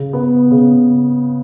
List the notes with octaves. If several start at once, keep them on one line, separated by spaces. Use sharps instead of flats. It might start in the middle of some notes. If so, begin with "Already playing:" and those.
Already playing: C#3
B3
C#3